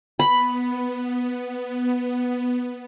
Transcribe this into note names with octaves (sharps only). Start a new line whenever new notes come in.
B3 B5